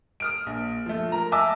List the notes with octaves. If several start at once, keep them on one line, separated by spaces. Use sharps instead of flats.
D#6 F6 D7
A#1
F3 A3
A#4 A#5
D#5 E5 G#5 A5 D6 E6